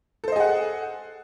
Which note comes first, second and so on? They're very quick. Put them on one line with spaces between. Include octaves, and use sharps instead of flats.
A4 C5 D#5 G#4 F#5